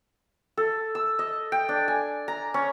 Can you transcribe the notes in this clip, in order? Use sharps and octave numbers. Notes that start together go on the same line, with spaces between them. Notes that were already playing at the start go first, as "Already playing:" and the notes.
A4
E6
D#5
G5
D4
G#5
A#5
C#4